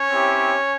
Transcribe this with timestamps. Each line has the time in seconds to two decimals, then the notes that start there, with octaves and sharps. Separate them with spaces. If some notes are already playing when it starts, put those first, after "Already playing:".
Already playing: C#4 C#5
0.10 C4 E4 G4